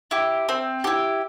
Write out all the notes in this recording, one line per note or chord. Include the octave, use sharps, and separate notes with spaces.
E4 G4
C4
E4 G4